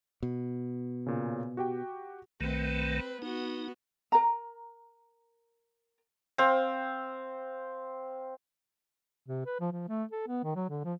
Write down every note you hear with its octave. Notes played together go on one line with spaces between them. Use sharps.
B2
A#2 C#3
F#4 G4 G5
B1 D#3 A3 C4 B4
B3 D#4 F#4
A#4 A#5
C4 F5
C3
B4
F3
F3
A3
A4
B3
D#3
F#3
D3
F3